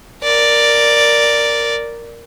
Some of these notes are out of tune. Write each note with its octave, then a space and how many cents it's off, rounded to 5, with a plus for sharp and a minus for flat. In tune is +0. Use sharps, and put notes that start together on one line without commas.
A#4 +0 D5 +0